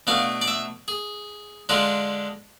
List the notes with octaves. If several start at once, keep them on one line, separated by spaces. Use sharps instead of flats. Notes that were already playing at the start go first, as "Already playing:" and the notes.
B2 A3 D4 F5
D5
E5
G#4
D3 G#3 D4 F4